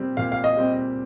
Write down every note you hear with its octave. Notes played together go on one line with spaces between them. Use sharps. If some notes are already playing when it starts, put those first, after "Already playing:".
Already playing: A#2 G3 C4
A#2 F5
F5
D#5
G3 C4